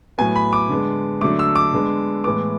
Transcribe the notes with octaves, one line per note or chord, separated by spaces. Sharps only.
A2 F#3 B3 G#5
B5
D6
D3 G#3 B3
D3 F#3 A3 D6
E6
D6
D3 G#3 B3
A2 E3 G#3 B3 D6